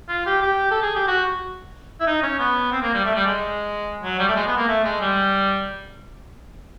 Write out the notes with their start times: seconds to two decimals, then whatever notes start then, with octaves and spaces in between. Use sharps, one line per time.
0.09 F4
0.26 G4
0.42 G4
0.71 A4
0.83 G#4
0.96 G4
1.08 F#4
2.01 E4
2.07 D#4
2.23 C#4
2.39 B3
2.72 C4
2.82 A#3
2.94 G3
3.05 A3
3.15 G3
3.26 G#3
4.03 F#3
4.20 G3
4.28 A3
4.36 G#3
4.47 B3
4.57 A#3
4.68 A3
4.85 G#3
5.01 G3